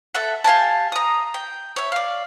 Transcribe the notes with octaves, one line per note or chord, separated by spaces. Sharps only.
A4 E5 F#5
G4 F5 G#5 A5
A#5 D#6
G5
C#5 E5
D5 F5